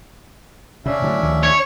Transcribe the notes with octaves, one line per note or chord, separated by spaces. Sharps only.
C#3 C#4 D4 E5
A2 D3 F#3
D2 D#3 F3
C#5